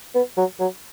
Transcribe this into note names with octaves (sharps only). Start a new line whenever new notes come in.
B3
F#3
F#3